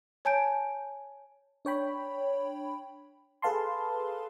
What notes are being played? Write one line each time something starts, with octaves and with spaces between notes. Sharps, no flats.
C#5 G#5 A5 G6 D7
D4 C#5 G5 B5
G#4 A4 B4 F5 A5 C6